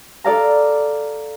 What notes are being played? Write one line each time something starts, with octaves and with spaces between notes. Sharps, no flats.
A4 D5 F5 A#5